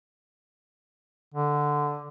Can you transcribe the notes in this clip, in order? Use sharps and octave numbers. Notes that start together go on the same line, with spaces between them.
D3